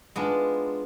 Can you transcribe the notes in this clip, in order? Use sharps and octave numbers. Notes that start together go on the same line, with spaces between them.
G#3 B3 D4 F4